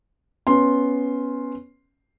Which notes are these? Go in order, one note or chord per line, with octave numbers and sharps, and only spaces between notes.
B3 C#4 C6